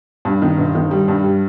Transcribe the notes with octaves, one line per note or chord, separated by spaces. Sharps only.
G2
D#3
G1
D#3
G3
G2
G3